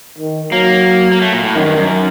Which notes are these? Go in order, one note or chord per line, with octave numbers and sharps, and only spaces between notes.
D#3
F#3 A#3
A#3
A3
A#2
A2
F#2 D#3
G2
F#2